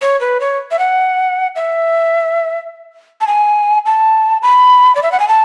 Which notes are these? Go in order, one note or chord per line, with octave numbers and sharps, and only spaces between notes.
C#5
B4
C#5
E5
F#5
E5
A5
G#5
A5
B5
D5
E5
F#5
G#5
A5